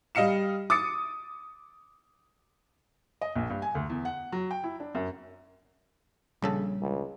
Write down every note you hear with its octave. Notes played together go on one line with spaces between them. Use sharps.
G3 D#5 F5 C#7 E7
D6 D#6 A6 C#7
D#5
A#1
G2
G#5
D2
E2
F#5
F#3
G5
E4
D4
F#2
A#1 C#3 G3 A4
C#2